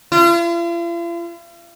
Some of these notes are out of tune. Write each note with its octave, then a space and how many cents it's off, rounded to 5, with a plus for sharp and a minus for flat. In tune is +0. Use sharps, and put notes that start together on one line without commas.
F4 -45